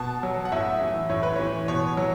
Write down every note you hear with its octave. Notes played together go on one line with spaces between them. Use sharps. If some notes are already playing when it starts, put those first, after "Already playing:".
Already playing: B2 A5
F#3
F#5
A2 E5
E3
A2 C#5
B4
E3 C#5
B2 C#5
F#3